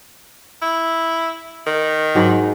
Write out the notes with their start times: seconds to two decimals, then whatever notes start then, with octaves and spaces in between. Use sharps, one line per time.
0.62 E4
1.66 D#3
2.15 G#2 F#3